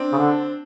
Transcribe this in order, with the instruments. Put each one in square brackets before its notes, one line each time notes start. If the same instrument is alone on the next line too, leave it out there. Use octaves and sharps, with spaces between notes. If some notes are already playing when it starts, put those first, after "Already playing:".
Already playing: [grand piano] C4 D4
[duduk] C#3
D3